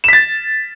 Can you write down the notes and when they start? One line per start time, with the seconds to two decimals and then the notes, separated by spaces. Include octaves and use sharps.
0.04 E7
0.08 B6
0.13 A6